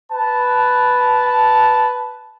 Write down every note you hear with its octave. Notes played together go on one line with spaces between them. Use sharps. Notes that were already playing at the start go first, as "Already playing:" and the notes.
B4 A5